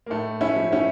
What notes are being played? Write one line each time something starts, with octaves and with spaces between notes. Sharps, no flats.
A#3
A2 A3
C#4 E4
F3
C#4 E4